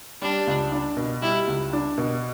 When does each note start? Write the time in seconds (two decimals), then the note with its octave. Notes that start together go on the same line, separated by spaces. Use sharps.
0.21 G3 D4
0.47 C#2
0.72 D4
0.97 B2
1.22 G3 E4
1.47 C#2
1.73 D4
1.98 B2